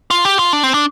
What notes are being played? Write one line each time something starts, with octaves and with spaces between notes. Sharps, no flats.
F4
G4
F4
D4
C4
D4